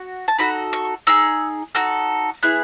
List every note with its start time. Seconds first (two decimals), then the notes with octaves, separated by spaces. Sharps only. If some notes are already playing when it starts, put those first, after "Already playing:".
Already playing: F#4
0.28 A5
0.38 D#4 F#4 A4 B5
0.73 C#6
1.07 D#4 G#4 E6
1.75 D#4 F#4 A4
2.43 B3 E4 G#4 F#6